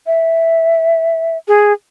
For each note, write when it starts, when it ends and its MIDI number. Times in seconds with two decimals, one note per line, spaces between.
0.06 1.37 76
1.48 1.73 68